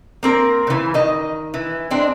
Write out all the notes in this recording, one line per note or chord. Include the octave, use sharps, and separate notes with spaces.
A#3 C4 A#4
C#3 E3
D#3 D#5
E3
G#3 C4 D4